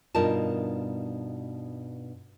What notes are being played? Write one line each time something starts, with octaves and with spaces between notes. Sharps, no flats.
G2 B2 D#4 F4 A#4 A5